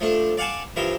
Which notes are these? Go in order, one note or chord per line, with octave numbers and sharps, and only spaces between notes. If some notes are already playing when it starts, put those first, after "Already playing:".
F3 A3 D4
D5 F5 F#5 G#5 A5
G2 E3 F3 A#4 E5